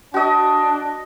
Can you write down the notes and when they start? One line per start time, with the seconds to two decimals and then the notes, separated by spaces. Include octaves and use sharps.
0.14 D4 F#4 D#5